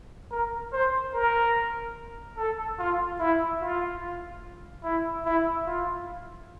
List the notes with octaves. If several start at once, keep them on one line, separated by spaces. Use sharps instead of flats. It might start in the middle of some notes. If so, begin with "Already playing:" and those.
A#4
C5
A#4
A4
F4
E4
F4
E4
E4
F4